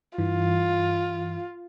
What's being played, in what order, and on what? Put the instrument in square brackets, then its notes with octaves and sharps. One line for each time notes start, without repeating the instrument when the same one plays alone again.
[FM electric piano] G2 E3 [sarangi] F4